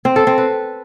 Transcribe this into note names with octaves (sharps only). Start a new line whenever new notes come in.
C4
A4
C4
B4